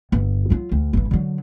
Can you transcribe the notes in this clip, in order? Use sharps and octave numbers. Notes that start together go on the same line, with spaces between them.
G1
F#3 F4
D2
G1 G2
D3 F#3